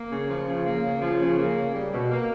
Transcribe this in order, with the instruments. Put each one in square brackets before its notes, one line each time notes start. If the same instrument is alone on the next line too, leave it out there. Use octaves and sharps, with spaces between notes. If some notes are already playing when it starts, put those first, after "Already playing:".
Already playing: [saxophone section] A#3
C#3
F3
C#3
A#3
C#3
F3
C#3
A#3
C#3
G3
B2
A#3